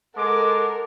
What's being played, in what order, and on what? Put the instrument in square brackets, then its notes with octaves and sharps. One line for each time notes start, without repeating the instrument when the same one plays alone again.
[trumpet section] G#3 F#5 D6 [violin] A4 A#4